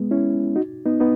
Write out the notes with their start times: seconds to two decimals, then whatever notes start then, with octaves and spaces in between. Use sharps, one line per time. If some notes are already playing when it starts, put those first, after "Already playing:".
Already playing: G#3 B3
0.11 C#4 E4
0.56 D#4 F#4
0.86 B3 D#4
1.00 B3 D#4